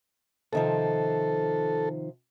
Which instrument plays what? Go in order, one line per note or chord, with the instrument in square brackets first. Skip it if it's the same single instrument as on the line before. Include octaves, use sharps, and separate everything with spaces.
[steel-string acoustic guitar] C3 D#3 F3 [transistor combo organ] A4